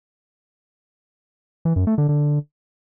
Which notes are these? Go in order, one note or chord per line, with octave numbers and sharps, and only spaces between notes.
E3
F#2
A3
D3
D3